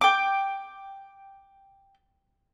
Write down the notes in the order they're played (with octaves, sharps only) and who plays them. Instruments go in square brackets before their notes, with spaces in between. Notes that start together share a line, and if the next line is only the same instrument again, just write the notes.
[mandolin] G5 D6